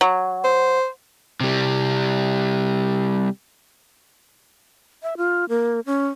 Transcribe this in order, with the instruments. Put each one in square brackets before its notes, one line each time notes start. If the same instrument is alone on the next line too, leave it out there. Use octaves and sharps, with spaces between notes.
[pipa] F#3
[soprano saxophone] C5
[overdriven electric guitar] C3 G3
[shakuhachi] E5
F4
A#3
C#4